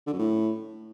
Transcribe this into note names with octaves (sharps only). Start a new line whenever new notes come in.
D3
F#2
A2